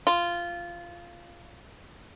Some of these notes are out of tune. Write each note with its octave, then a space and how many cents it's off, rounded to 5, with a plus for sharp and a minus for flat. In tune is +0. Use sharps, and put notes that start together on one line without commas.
F4 -10